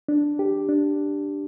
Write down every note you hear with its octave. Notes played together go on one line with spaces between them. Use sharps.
D4
G4
D4